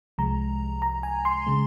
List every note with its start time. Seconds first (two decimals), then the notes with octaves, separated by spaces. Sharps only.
0.18 C2 C3 F3 G#3 A#5
0.82 A#5
1.03 G#5
1.25 C6
1.47 C#3 G#3